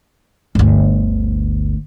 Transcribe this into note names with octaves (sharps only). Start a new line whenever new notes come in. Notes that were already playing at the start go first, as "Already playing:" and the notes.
G1 D2